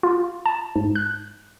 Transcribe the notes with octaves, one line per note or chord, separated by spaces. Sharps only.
F4
A5
G#2
F#6